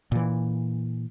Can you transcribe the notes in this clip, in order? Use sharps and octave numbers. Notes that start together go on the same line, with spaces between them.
A#2 E3